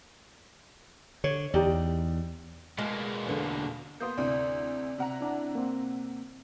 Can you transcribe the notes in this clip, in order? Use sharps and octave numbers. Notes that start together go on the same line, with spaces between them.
D3 C#5
E2 D#4 G4 D5
B2 G#3 A#3
E2 D3
A#3 B3 C6 D#6 G6
D2 A2 C3 D5
C3 F#5 A#5
D4 E4
A#3 C4